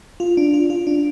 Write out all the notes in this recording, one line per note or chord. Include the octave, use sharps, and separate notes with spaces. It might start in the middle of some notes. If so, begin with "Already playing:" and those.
F4
D4
F4
F4
D4